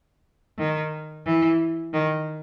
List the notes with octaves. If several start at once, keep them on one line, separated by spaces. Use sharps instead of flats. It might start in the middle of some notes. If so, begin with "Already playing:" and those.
D#3
E3
D#3